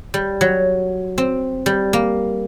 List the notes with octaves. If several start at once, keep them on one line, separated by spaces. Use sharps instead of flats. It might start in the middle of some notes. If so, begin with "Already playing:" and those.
G3
F#3
C4
G3
A#3